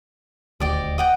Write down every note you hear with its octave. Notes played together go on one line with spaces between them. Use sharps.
D#1 D2 G4 D5 D#5
D#5 F#5 G5